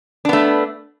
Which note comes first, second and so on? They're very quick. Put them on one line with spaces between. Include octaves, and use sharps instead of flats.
D4 B3 A3